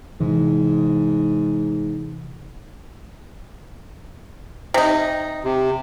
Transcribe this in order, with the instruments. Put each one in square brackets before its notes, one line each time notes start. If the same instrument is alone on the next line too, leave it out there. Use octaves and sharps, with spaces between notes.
[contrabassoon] G#2 [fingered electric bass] C3 E3
[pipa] C3 D#4
[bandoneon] C3